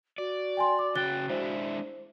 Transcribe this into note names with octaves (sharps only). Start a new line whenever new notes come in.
F#4 D5
G5 G#5 C6
D6
C#3 G5 F#6 A6 G7
G#3 D4 E4 C5